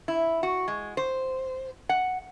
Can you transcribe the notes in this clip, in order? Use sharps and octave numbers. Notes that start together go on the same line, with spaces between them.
E4
F#4
G#3
C5
F#5